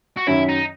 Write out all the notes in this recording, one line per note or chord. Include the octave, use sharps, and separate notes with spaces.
F#4
F#2 D#3 F#3 C#4 E4
D#4